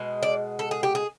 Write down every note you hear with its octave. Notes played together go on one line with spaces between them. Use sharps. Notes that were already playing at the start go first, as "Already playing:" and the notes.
Already playing: B2 G#3
D5
A4
G#4
G4
G#4